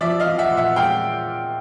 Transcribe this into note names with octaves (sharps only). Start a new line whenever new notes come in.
F3 D5 E5
D#5 F5
F3
E5 F#5
A#2
E5 F#5
G#3 F5 G5